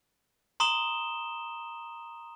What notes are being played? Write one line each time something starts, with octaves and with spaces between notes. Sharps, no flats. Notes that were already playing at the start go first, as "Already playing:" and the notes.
A#5 C6 D#6 E7 G7